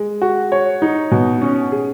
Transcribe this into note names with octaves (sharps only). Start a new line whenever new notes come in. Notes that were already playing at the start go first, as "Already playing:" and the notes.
Already playing: G#3
F#4
C#5
D#4
B2
C#4
G#4